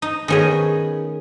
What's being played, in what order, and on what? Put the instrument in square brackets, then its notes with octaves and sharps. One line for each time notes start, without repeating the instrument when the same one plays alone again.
[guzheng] D#4
[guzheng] D#3 C#4 D#5 [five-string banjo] A3 B3 G#4